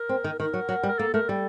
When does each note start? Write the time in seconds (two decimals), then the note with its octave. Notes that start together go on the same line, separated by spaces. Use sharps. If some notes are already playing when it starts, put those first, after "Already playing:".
Already playing: A#4
0.09 C4
0.24 D#3
0.39 D#3 A#4
0.54 F#3
0.69 F#3
0.83 G3
0.88 A#4
0.99 A#3 A4
1.14 A3 A#4
1.29 G3 A4